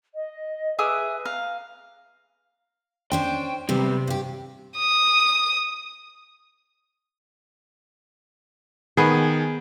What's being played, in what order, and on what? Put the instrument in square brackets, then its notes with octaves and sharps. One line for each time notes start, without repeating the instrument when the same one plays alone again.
[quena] D#5
[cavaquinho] G#4 E5 D6 [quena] B4
[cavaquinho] F5 A#5
[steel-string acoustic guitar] C#4 D4 C5 [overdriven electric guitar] G5
[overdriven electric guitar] C3 [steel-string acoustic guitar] G3 B3 C4
[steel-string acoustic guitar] G2 G4
[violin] D#6
[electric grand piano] D#3 G#5 [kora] B3 G#4